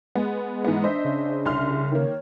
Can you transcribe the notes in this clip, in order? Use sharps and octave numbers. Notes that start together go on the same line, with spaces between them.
G#3 B3
G#2 E3 B3
D4 C5 D#5 E5
C#3
C2 C6 F6
D#3 A#3 C#5